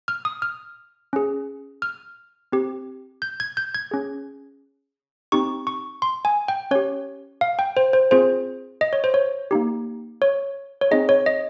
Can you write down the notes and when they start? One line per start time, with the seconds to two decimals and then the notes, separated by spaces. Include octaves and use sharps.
0.08 F6
0.25 D#6
0.42 F6
1.13 C#4 G#4
1.82 F6
2.52 C4 G4
3.22 G6
3.40 G#6
3.57 G6
3.75 G#6
3.91 C#4 G#4
5.32 C4 D#4 G4 C#6
5.67 C#6
6.02 C6
6.25 G#5
6.48 G5
6.71 C#4 G4 C#5
7.41 F5
7.59 G5
7.77 C5
7.93 C5
8.11 C4 F4 G#4 C5
8.81 D#5
8.93 C#5
9.04 C5
9.14 C#5
9.51 A#3 D#4 G4
10.22 C#5
10.81 C#5
10.91 C4 D#4 G#4 D#5
11.09 C#5
11.26 D#5